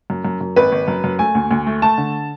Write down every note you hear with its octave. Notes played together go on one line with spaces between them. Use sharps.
F#2
F#2
F#2
G#1 B4
G#1
F#2
F#2
A3 G#5
D2
D2
A3
A3 A5
D3